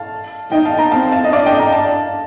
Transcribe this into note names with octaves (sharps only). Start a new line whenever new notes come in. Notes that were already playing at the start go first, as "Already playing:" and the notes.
Already playing: F5 A5
D#4 D#5 G5
F5 A5
G5 A#5
C4 F5 A5
F5 A5
D#5
D4 D5 F5
D#5 G5
G5 A#5
F5 A5